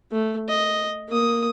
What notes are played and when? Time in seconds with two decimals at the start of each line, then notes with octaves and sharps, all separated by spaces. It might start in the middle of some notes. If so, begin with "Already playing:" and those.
0.12 A3
0.49 D#5
1.08 A#3 D#6